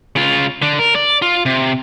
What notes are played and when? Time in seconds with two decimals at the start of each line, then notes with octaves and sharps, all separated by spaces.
0.16 C#3 F4
0.62 D3 D4
0.79 A#4
0.95 D5
1.22 F4
1.46 C3